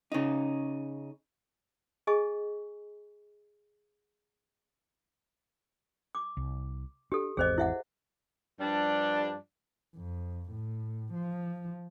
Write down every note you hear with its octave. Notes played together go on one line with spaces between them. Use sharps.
C#3 D#4
G#4 D#5 G#5 C#6
D6
C2
D4 G4 A4
G#1 E2 C4 G#4 C5 D#5
E4 E5 F#5
G2 F3 G3 D4
F2
A2
F3